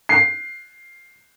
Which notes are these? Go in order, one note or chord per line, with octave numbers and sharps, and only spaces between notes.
C7